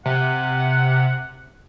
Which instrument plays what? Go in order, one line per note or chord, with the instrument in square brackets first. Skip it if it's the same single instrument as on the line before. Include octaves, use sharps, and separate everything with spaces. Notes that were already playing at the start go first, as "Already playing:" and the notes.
[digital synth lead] C3 [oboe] F#5